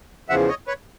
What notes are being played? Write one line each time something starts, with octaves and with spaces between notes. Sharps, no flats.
E2 C#3 F3 E5 F#5
C#5 D#5
B4 C#5